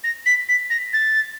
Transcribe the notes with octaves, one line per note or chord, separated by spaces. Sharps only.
A#6
B6
B6
A#6
A6